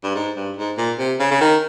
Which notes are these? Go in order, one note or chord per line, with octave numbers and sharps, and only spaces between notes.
G2
G#2
G2
G#2
A#2
C3
C#3
C#3
D#3